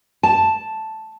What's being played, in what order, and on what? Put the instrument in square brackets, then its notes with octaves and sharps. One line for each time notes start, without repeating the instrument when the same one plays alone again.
[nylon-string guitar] A5